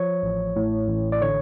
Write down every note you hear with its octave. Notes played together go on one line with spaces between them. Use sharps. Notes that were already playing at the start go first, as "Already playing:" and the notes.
Already playing: F3 C#5
A1
A2
A1
D5
D3 C#5